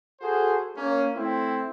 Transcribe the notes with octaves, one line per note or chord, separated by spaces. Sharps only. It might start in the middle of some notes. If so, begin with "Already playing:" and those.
F#4 G#4 A4 C5
A#3 C#4
A3 C4 E4